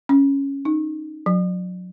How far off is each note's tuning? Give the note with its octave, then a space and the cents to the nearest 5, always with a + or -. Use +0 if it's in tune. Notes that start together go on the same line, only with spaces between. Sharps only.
C#4 +0
D#4 -5
F#3 -30